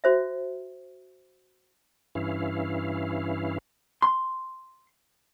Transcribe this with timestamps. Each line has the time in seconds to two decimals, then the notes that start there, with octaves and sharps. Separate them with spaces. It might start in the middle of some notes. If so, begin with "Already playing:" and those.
0.04 F#4 C5 E5
2.15 G2 E3 C#4 E4 F5
4.02 C6